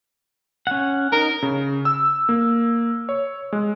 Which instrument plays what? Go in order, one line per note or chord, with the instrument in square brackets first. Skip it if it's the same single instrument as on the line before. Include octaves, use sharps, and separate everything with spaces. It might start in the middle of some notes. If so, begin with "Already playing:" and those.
[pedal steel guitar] C#4 F#5
[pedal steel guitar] D#4 [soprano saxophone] A#4
[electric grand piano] C#3
E6
A#3
C#5
G#3